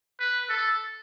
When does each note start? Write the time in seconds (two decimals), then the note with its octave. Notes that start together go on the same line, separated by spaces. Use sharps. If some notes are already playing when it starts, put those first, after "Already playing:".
0.20 B4
0.49 A4